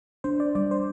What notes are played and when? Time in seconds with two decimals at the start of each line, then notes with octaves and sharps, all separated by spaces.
0.24 D4 C5
0.40 D5
0.55 G3 D5
0.71 C5